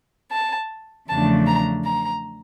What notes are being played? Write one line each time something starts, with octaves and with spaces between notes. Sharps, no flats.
A5
E2 C#3 F3 A3 D4 A5
A#5
A#5